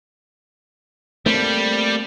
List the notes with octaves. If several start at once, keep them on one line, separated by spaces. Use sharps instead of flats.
G3 A3 A#3 C4